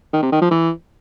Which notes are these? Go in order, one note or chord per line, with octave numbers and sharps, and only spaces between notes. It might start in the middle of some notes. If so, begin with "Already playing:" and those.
D#3
C3
D#3
F3
E3